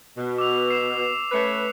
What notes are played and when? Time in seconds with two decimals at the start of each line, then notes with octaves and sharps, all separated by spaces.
0.16 B2
0.38 D6 E6 F7
0.70 C7 E7
1.31 A3 C#4 B4 F#6 C#7